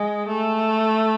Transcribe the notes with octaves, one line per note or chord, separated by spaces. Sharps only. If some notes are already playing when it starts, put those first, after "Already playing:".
Already playing: G#3
A3